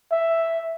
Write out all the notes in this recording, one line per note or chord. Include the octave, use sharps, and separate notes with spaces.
E5